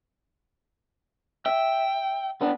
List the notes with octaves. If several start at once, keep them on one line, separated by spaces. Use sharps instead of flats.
E5 G5
B3 D4